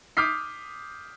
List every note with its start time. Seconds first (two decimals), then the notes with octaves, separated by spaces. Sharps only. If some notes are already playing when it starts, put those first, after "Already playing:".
0.17 D6 D#6 F6 G6 B6 C7